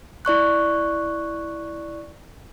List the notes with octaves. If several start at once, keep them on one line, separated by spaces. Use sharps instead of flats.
E4 D5 C#6 F#6